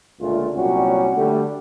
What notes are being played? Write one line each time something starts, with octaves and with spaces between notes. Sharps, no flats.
C#2 A#2 D3 A3 F4
C2 A#2 F#3 G3 C#4 F#4
D3 G3 A3